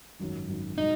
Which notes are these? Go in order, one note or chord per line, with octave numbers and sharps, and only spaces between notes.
G#1 F#2 D#3 F#3
G#1 F#2 D#3 F#3
B2 G#3 D#4